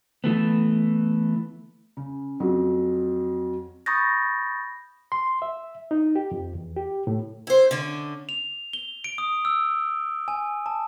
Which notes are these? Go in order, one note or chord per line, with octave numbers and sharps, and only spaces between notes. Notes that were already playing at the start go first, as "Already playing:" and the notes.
E3 A3 B3
C#3
F2 F#3
B5 C#6 D#6 G6 A6 A#6
C6
E5
D#4
G4
F2
E2
G4
A2
E4 C5
D3 C#4
F7
G7
D7
D#6
E6
G#5
A5